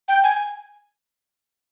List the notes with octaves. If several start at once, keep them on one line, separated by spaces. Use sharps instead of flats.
G5
G#5